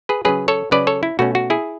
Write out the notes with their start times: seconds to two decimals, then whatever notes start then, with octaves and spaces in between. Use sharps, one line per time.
0.09 G#4 B4
0.25 C#3 F#3 C#4 G#4 B4
0.48 A4 C#5
0.71 C#3 F#3 C#4 B4 D5
0.87 A4 C#5
1.03 E4
1.19 B2 A3 C#4 F#4
1.35 F#4
1.50 E4 G#4